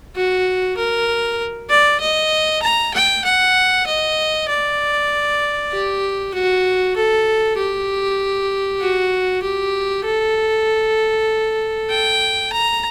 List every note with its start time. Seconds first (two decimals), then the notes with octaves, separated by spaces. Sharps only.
0.16 F#4
0.78 A#4
1.70 D5
2.01 D#5
2.63 A#5
2.94 G5
3.25 F#5
3.87 D#5
4.49 D5
5.72 G4
6.34 F#4
6.97 A4
7.58 G4
8.82 F#4
9.43 G4
10.05 A4
11.90 G5
12.53 A#5